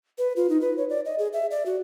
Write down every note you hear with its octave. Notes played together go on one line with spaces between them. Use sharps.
B4
F4
D#4
B4
C#5
D5
D#5
G#4
E5
D5
F#4